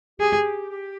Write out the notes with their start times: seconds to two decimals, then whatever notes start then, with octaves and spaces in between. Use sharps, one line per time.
0.20 G4 G#4
0.70 G4